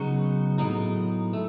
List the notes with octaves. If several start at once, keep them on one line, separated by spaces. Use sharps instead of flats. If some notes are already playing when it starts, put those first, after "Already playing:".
Already playing: C#3 F#3 B3 D#4 F#4
A2 F#3 B3 D#4
A3